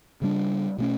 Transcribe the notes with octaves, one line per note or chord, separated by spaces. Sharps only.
C#3 G3 D4
B2 A3 C#4